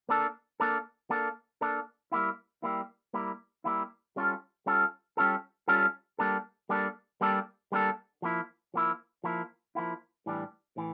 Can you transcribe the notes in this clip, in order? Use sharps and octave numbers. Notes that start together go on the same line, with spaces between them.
A#3 D4 A4
A#3 D4 A4
A#3 D4 A4
A#3 D4 A4
G3 A#3 E4
G3 A#3 E4
G3 A#3 E4
G3 A#3 E4
G3 C#4 F4 A4
G3 C#4 F4 A4
G3 C#4 F4 A4
G3 C#4 F4 A4
G3 A#3 D4 A4
G3 A#3 D4 A4
G3 A#3 D4 A4
G3 A#3 D4 A4
F3 A#3 E4
F3 A#3 E4
F3 A#3 E4
F3 A#3 E4
A2 E3 G3 D4
A2 E3